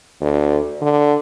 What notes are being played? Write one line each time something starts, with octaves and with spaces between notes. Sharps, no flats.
D2
D3